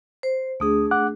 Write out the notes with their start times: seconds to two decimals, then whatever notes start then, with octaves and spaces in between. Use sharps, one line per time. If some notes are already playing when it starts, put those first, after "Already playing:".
0.23 C5
0.60 D2 A3 D4 G#4 D#6
0.91 F#5 D6 F#6